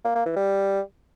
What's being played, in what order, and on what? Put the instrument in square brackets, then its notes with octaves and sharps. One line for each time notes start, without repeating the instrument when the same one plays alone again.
[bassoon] A#3
A#3
E3
G3